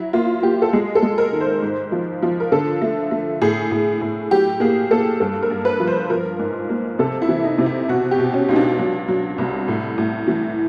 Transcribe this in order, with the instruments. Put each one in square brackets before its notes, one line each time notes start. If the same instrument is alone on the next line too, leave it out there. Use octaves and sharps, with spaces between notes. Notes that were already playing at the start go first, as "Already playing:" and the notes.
Already playing: [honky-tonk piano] F#3 E4
A#3 F4
A#3 G4
A4
G#3 G#4
A4
G#3
A#4
D#3
C5
G#2
F3
F3
A#4
D3 A4
A3
A3
A2 G#4
A2
A2
F#3 G4
A#3 G#4
A#3 A4
G2 A4
A#4
G2
B4
F3
C5
F3 A#4
G#2
A#3
C3 A4
E4
E3
D#4
C3
E4
B2 F#4
G4
B2
C#4
C#2 D#4
D4
F#3
F#3
C2
A2
A2
E3